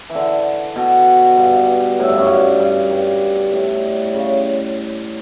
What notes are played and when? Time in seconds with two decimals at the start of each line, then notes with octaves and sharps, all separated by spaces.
0.10 E3
0.15 D3
0.76 B2
1.37 G2
1.99 A2
2.08 G2
2.17 F#2
2.26 G2
2.60 G2
2.91 G2
3.52 A2
4.14 C#3